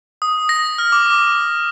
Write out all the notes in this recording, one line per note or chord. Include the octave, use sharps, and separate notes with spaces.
D#6
A#6
F6
D6